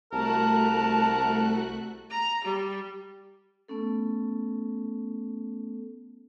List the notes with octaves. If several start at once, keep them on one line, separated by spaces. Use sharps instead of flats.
C2 A3 F#4 A#4 A5 F#6
A#5
G3
A3 B3 C#4 A4